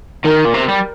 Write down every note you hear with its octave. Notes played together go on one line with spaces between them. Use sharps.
D#3 A#4
A#2
C3
G3